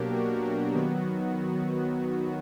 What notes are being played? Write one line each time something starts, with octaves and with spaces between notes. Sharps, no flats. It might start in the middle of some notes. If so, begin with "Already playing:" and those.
Already playing: B2 F#3 A#3 D4 G4 A#4
F#4
F#4
D#3 F#3 B3